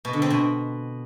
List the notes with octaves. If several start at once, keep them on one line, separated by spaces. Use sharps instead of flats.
B2
D3
C4
B2